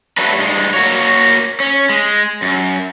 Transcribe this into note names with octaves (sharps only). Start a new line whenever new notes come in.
F#3 G3 A3 D4 A4 B4
G2 G#3
A#3 F#4 C#5
C#4
G#3
F#2